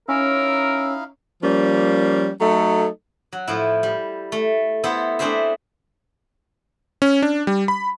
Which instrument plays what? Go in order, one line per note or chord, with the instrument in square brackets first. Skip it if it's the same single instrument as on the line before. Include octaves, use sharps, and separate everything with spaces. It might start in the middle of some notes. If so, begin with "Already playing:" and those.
[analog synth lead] C#4 [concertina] D#4 E4 F5 [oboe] A#4 [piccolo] E6
[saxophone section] F3 G3 A#3 C#4
F#3 A3 D#4 A4
[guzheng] F#3
A2 F3 E4
G3
A3
B3 E4 A4 C5
A3 C4 D4 G#4 C5 E5
[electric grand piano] C#4
D4
G3
B5